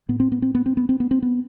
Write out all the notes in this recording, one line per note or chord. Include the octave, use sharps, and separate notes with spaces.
A2 B3
C4
B3
C4
B3
C4
B3
C4
B3
C4
B3